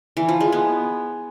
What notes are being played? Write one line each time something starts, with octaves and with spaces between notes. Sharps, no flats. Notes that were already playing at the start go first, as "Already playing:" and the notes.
E3
F3
G#3
B3